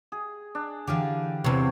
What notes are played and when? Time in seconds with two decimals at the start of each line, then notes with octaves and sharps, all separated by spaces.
0.12 G#4
0.55 D4
0.87 D3 E3 D4 G4 F5
1.44 E2 C3 C#5